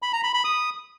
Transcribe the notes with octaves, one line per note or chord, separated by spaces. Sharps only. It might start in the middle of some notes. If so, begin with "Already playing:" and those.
B5
A#5
B5
B5
D#6